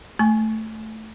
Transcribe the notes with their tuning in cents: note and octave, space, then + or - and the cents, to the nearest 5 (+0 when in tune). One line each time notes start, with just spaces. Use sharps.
A3 +0 G#5 +15 C#6 +0